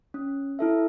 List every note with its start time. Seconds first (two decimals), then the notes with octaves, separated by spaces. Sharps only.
0.14 C#4
0.59 E4 A4 E5